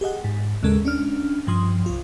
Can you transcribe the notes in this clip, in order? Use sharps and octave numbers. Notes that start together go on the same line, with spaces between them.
G4 G#4 D#5 F#5
G#2
D#2 C#3 G#3 A4 A#4
C#4 D4 F6
G2 F3 C6 D#6
C2 F4